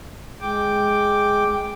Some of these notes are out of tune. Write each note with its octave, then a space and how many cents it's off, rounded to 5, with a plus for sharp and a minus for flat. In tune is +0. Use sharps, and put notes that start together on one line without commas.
G#3 +0 G5 +0 D6 +0